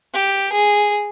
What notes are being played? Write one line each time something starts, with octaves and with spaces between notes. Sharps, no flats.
G4
G#4